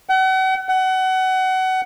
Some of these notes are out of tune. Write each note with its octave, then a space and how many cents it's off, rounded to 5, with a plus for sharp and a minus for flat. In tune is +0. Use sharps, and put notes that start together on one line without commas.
F#5 +40
F#5 +25